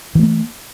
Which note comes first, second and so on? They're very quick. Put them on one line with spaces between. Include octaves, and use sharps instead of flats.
E3 A3 A#3